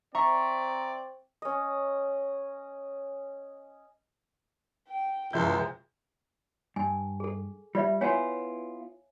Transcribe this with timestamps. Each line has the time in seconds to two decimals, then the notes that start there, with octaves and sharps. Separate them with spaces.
0.15 C4 D5 E5 A#5 C#6
1.42 C#4 D#5
4.88 G5
5.33 C#2 F#2 C3 F3 G#3 E4 G6
6.76 G2 G#5
7.20 G#4 A4
7.75 G3 F4 D5 E5
8.01 B3 E4 F4 C#5 G#5